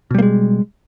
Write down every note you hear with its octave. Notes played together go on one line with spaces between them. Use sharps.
B2 G3 G#3 A#3